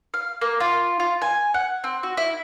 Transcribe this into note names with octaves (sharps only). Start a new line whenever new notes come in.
F5
A#3
F4
F4
G#5
F#5
C4
F#4
E4